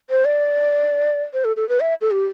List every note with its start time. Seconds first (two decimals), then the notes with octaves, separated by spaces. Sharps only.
0.10 C5
0.25 D5
1.33 C5
1.45 A4
1.57 A4
1.69 B4
1.80 E5
2.01 A4
2.11 G4